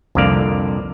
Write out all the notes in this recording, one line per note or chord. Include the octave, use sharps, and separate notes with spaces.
C2 F2 D3 A#3 D5 F5